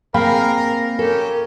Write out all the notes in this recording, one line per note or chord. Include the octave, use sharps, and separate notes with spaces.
A#3 C4 G#4 A#4 F5 G5 B5
A#3 C#4 G4 A4 A#4